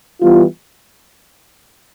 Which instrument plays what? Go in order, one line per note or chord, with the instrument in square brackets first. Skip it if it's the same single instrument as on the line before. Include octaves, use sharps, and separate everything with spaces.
[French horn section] E3 G3 B3 F4